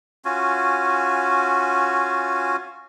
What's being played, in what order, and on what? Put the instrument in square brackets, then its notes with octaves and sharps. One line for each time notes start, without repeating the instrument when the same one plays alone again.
[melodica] C#4 F4 F#4 G#5